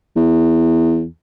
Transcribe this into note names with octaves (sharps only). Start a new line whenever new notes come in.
E2